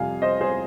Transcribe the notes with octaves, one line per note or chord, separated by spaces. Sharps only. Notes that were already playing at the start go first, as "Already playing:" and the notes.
Already playing: F2 C3 G3 F5 G#5
C5 D#5
G#4 C5